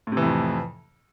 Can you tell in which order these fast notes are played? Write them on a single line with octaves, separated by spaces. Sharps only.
A2 C3 E3 F2 F3